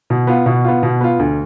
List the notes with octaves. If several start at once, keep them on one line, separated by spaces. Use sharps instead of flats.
B2
B3 F4
B2
B3 F4
B2
B3 F4
D2